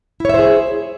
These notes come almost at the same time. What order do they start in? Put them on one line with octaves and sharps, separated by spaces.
E4 C#5 E5 C5 G#4